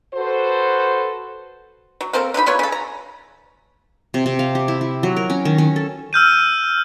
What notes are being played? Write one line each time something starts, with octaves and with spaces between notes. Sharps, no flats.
F#4 A4 B4 C5
F#3
A#3 C4 A4 A#4
D3 F#3 D#4 B5
F#3 B3 F4 C#5
C#3 A4
A#5
C3
C3
F5
G4
E4
E4
F#3
A#4
C#4
D#3
C#4
A4
E6 F6 G6 D#7